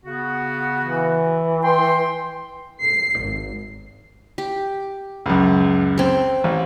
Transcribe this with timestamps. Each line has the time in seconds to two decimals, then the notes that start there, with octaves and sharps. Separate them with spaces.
0.05 C#3 B3 F#4
0.84 E3
1.63 G5 C6
2.83 C7
3.22 G#1
4.38 G4
5.26 C#2 F#2
5.98 C4 A4
6.44 A1